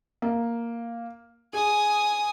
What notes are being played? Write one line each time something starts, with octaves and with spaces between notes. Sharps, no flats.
A#3
G#4 G#5 D#6